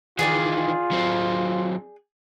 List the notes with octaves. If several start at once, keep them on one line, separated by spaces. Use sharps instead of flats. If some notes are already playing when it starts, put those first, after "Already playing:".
D#3 E3 F4 G#4 D5 G5
F#3 C4